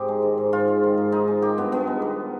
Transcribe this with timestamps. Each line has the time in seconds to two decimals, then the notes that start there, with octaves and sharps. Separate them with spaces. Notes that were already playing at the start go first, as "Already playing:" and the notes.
Already playing: G#2 C4 G4
0.08 G#3
0.22 D#3
0.38 G#2
0.53 G#2 F4
0.68 G#3
0.83 D#3
0.98 G#2
1.12 G#2 D#4
1.28 G#3
1.42 D#3 G4
1.58 G2 B3
1.72 G2 B3
1.87 G#3
2.02 D#3